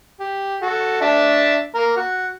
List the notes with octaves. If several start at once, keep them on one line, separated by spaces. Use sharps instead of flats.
G4
F#4 A4
D4 E5 A5
A#3 A#4
F#4 F#5